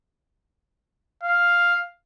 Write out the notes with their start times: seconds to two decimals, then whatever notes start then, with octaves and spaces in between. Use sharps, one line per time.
1.24 F5